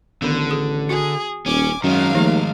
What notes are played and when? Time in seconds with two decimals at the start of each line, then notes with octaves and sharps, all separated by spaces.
0.22 A1 D3 D#3 B3
0.51 G#4
0.89 F#4 G#4
1.46 D#1 C#4 G#5 D6
1.84 F#2 D#3 G#3 A#4 F5
2.15 D#2 F3 A3